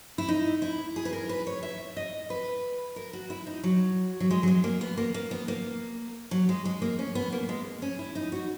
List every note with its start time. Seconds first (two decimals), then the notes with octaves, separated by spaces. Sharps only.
0.18 E4
0.28 D#4
0.62 E4
0.96 G#4
1.05 B4
1.13 A#4
1.29 B4
1.47 C#5
1.63 E5
1.97 D#5
2.30 B4
2.96 A#4
3.13 F#4
3.30 E4
3.47 D#4
3.63 F#3
4.20 F#3
4.31 G#3
4.43 F#3
4.47 G#3
4.64 A#3
4.81 B3
4.97 A#3
5.14 A#3
5.31 B3
5.48 A#3
6.31 F#3
6.49 G#3
6.65 G#3
6.82 A#3
6.99 C#4
7.15 B3
7.32 A#3
7.49 G#3
7.82 C#4
7.99 E4
8.15 D#4
8.32 F#4